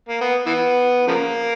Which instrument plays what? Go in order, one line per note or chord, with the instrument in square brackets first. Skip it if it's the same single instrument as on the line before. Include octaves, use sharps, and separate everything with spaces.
[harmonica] A#3
B3
E3 B3
C#3 F3 A#3